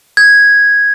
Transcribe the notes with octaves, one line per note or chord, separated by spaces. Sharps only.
G#6